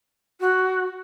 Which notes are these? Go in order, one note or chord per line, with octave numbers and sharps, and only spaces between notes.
F#4